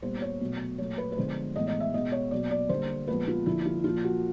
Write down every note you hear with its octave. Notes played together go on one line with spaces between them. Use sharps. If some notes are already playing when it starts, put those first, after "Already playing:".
A#2 G3 B3 C5
C#5
B2 F#3 A3
A#2 F#3 A3 C#5
B4
B4
D3 F3 G#3 B3 C5
A2 E3 G#3 B3 D#5
D#5
E5
B2 G#3 B3 D#5
C#5
B2 F#3 A#3 D5
D5
D3 G3 A#3 C5
A#2 F3 G#3 B3 B4
F4
D3 F3 A#3 E4
F4
A#2 F3 A#3 F4
F#4